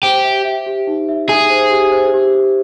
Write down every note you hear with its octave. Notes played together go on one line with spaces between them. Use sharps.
G4 C5
E5
E5
G4
D#4
E5
G#4 E5
C5
G4
C5
G4
G4